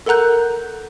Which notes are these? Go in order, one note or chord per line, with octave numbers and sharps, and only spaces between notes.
A4 A#4 F#5 A#5 F#6 G6